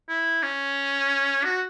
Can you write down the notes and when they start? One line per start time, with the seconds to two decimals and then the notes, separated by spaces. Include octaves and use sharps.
0.09 E4
0.43 C#4
1.44 F#4